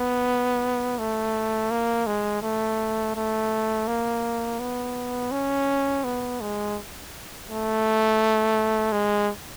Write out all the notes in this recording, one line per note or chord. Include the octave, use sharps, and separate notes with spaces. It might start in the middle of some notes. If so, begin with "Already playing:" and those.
Already playing: B3
A3
A#3
G#3
A3
A3
A#3
B3
C#4
B3
G#3
A3
G#3